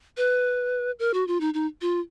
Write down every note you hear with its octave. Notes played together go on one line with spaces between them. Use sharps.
B4
A#4
F#4
F4
D#4
D#4
F4